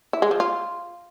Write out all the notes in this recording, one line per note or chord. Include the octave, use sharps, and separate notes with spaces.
E4
G#3
F3
F4